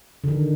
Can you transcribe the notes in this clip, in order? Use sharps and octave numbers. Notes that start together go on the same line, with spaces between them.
D3
D#3